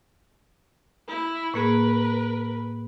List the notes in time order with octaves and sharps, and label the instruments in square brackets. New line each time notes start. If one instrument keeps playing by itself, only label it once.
[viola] E4
[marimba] A2 A#3 G#4 [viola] A#4 B4